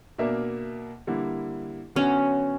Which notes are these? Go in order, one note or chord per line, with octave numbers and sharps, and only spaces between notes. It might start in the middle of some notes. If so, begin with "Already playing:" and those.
B2 A#3 D4 A#4 E5
D3 G3 A#3 E4
D3 F#3 B3 C#4 F#4